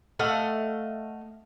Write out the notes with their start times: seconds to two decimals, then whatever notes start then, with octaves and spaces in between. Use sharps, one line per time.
0.19 A3 D#5 F5 F#5